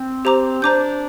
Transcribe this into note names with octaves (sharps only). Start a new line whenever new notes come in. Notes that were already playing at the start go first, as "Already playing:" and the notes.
Already playing: C4
G4 C5 A#5 D6
D4 C5 A#5 D6 G6